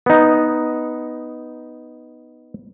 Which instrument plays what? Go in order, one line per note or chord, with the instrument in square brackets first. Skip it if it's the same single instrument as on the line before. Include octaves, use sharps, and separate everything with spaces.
[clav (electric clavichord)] B3 D#4